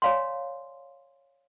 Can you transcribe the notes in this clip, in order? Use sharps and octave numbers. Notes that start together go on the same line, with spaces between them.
C#5 D5 F5 G#5 A#5 C6